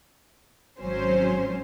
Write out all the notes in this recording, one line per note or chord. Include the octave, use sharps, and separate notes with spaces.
G#1 F#3 C#4 C5